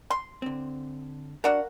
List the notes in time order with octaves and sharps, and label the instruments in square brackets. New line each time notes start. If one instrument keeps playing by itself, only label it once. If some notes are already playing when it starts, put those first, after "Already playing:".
[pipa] C6
[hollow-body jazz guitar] D3 C4
[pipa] D4 F#4 [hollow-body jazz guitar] A#4 F5 F#5